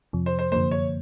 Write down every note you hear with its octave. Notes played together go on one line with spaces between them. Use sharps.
F2 C3 F3
C5
C5
F#2 D3 F3 A#3 C5
C#5